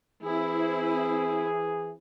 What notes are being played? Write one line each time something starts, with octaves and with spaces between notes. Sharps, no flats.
E3 C4 E4 G#4